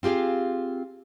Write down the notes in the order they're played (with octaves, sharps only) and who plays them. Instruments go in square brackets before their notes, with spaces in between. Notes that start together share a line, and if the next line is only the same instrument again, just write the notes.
[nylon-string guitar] C4 F4 G4 G#4 F5